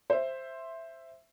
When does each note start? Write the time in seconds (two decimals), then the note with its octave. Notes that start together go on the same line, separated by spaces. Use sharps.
0.10 C5 E5